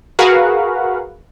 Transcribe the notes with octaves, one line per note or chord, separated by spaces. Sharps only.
F#4 G#4 A#4 B4 F5 F#5